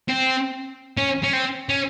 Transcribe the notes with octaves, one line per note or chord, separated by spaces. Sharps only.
C4
C#4
C#4
C4
C#4